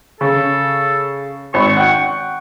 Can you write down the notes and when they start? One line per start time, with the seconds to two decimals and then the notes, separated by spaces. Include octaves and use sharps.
0.21 C#3 A4
1.54 G#1 C#6
1.77 F#5 G5